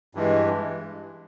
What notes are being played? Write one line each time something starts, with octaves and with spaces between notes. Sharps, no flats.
G2 E3 G#3